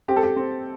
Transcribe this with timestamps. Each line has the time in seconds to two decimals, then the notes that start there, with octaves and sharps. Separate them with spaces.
0.08 C4 G4
0.16 A4
0.23 G4
0.36 C4